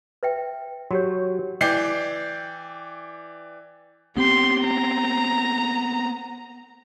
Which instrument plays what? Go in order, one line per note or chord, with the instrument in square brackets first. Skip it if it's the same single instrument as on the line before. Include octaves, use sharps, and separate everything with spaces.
[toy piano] B4 E5 G5
[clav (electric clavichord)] F#3 [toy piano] F#4 G4 C#5
[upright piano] E3 D5 G5 G6 C7
[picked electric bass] B3 C4 [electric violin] G4 C6
[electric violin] A#5